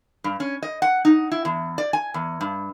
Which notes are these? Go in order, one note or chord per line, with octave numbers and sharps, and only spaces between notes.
G2
C#4
D#5
F#5
D#4
E4
E2
D5
G#5
E2
G2